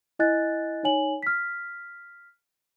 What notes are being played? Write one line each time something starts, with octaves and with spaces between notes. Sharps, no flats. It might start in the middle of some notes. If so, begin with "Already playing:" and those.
E4 D#5 G#5 F#6 A6
D#4 C#5 G#5 F#7
F6 B6